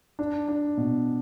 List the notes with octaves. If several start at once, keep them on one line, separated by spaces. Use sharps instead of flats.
D4
D4
B2